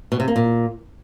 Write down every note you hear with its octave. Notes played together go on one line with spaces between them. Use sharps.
B2
C3
A#3
A#2